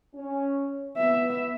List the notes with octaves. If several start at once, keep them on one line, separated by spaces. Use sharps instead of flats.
C#4
B3 E5